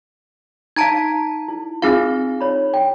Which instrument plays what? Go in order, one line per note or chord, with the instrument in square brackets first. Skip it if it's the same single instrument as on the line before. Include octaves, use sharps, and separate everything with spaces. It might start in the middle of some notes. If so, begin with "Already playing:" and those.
[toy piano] D#4 F5 [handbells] A5 A#5 G#6
[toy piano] E4
[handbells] C4 D#4 F5 [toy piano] F4 G#4
[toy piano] C#5 B5
G5